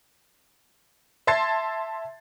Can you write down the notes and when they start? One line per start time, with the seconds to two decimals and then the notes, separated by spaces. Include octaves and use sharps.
1.27 E5 A5 C6 G#6 A6 C7